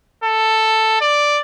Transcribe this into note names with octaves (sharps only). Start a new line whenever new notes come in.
A4
D5